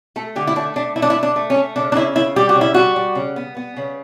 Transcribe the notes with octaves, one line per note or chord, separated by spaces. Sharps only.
A3 A4
D3 G4
E4
A3 D4
A3 D4
A3 E4
D4
E4
A3
D4
A3
C#4
A3
C#3 D4
D4
C#3 E4
C#3 E4
G3 G4
F#4
C#3
E4
G3 F#4
G3
C#3
B3
B3
C#3